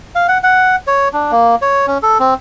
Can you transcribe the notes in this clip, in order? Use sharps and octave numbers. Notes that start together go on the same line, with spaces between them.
F5
F#5
F#5
C#5
D4
A#3
C#5
C#4
A4
C4